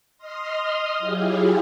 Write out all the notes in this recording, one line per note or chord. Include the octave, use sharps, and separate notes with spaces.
D#5 C6 D#6 F6
F#3 E4 F4 G4 G#4